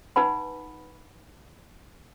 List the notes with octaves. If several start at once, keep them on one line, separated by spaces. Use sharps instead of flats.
D#4 B4 F#5 G#5 B5